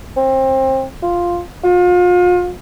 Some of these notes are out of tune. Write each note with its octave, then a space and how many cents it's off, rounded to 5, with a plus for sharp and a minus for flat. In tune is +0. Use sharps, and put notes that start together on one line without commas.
C4 +25
F4 +0
F4 +35